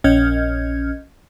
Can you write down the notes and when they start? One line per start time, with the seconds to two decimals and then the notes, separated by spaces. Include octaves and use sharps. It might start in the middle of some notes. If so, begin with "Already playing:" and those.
0.04 A#1 C#4 D#5 F6 G6 G#6